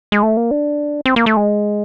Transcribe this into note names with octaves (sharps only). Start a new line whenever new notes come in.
G#3
A3
A#3
D4
C4
A#3
A3
G#3